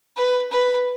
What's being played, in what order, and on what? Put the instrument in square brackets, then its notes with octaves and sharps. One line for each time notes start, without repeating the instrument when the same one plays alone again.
[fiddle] B4
B4